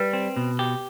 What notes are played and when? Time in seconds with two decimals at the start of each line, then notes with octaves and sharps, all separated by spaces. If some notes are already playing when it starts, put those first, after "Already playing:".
Already playing: G3 B4
0.13 C4
0.37 B2
0.59 G4